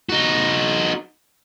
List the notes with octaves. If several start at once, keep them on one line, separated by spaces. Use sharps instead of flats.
D#4 F#4